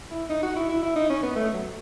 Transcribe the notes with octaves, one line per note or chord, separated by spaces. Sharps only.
E4
D#4
F#4
E4
E4
E4
D#4
C#4
B3
A3
F#3